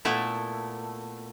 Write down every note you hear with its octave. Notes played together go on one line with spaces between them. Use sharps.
A#2 A3 B3 E4